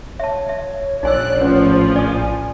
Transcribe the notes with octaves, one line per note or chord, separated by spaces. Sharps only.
C#5 E5 A5
E5
A#1 D#4 D5 G#5 E6 F#6
A2 F3 C#4 B4
D5 G#5 D#6